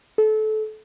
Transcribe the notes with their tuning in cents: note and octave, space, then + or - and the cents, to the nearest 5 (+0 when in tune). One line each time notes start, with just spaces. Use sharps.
A4 -25